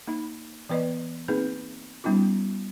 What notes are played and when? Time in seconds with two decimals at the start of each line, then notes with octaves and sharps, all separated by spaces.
0.07 A#3 D#4 B5
0.69 E3 B3 B4 D5 D#5
1.28 A#3 C4 D#4 G#4 B4
2.04 G3 B3 C#4 D#4 F4